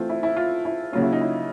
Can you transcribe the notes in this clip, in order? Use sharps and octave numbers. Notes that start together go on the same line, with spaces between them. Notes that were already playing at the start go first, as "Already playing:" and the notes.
Already playing: E3 A3 C4 F4
E4
E4
F4
E4
C#3 F#3 A#3 C#4 F4
E4
D#4
E4